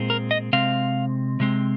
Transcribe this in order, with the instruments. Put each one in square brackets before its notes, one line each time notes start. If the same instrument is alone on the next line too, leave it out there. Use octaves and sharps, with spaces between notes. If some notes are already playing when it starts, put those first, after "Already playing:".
Already playing: [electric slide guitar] A#2 G#3 C4
A#4
D#5
C3 G#3 C4 F5
C3 G#3 C4